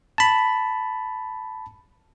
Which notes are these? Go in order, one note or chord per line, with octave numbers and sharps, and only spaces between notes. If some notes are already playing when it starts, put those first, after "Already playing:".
A5 B5